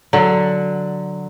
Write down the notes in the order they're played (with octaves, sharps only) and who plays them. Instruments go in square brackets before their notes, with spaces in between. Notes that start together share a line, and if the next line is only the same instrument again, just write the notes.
[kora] D3 F#3